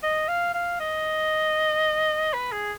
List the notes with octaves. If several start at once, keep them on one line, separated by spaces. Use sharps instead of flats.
D#5
F5
F5
D#5
B4
G#4